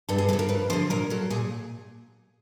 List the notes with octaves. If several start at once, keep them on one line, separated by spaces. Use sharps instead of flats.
G2 A4
G#4
D3 A4
F3
A#4
G2 B4
D3 F3 C5
A#2 A#4
F#3 A4
A#2 G#4